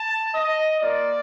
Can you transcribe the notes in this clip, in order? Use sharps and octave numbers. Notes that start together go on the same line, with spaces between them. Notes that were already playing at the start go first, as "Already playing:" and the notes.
Already playing: A5
D#5
A#3 F4 D5